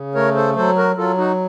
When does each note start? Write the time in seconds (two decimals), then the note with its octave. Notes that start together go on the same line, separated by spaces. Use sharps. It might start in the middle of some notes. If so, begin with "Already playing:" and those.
Already playing: C#3
0.15 A3 A#4 C#5
0.35 A4 C5
0.56 F#3 A4 C5
0.76 F#4 A#4
0.97 F#3 F4 A4
1.18 D#4 F#4